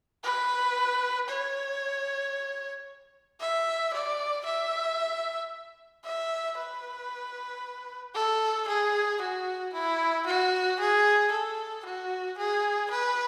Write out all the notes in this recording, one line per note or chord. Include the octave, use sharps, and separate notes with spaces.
B4
C#5
E5
D5
E5
E5
B4
A4
G#4
F#4
E4
F#4
G#4
A4
F#4
G#4
B4